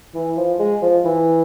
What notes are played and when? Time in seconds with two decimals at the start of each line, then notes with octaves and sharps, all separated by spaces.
0.14 E3
0.37 F3
0.60 G#3
0.82 F3
1.05 E3